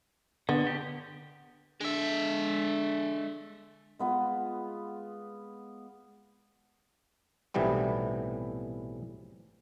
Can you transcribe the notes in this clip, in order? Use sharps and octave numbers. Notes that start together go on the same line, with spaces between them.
D3 B3
G4
D3 G#3 E5
G#3 B3 F4
B1 A2 C3 E3 G3 B3